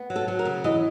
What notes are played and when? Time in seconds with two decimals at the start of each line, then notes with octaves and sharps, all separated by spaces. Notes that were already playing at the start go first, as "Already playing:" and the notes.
Already playing: B3
0.10 F#3
0.16 A4
0.28 F#3
0.39 A#4
0.45 C#3
0.64 E3 D#5